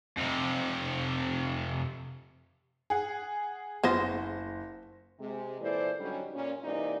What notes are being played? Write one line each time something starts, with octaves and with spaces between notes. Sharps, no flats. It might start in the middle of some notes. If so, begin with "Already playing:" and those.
F2 C3
G#4 F#5
F#1 B3 F4 C5 A#6
C3 G#3
A#2 E3 E4 A4 C5 D5
G#2 D3 F#3 G3 C#4 D#4
A#2 C#4
G#2 C3 E3 A#3 D#4 D5